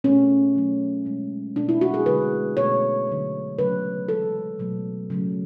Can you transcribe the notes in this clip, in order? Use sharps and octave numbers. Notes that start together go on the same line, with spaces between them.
B2 A3 C#4
B2 F#3 A3
B2 G#3
B2 A3 D4
E4
F#4
G#4
D3 G#3 B4
B2 A3 C#5
D3 F#3 A3
C#3 F#3 A3 B4
C#3 E3 G#3 A4
B2 F#3 A3
C#3 F#3 A3